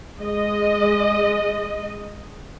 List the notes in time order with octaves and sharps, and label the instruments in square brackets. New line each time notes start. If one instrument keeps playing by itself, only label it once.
[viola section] G#3 D#5